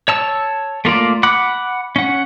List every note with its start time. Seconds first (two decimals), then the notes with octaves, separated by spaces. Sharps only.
0.08 C#5 A5 E6
0.85 A3 A#3 F4 D5
1.23 F#5 B5 D6 F#6
1.96 C#4 F#5